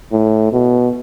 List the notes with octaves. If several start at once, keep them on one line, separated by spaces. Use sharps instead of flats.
A2
B2